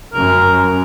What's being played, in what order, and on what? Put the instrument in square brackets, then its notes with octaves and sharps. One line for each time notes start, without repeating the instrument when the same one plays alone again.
[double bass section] F#2 [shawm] A#4